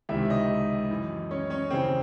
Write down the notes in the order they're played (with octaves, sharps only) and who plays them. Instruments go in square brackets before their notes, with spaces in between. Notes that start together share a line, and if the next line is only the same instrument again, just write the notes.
[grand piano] C#2 C3 D#3 E4 E5
D#4 D#5
F#2 E3
C#4 C#5
C#4 C#5
D#2 C#3 E3 C4 C5